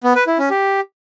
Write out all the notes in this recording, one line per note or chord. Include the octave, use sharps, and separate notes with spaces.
B3
B4
E4
C#4
G4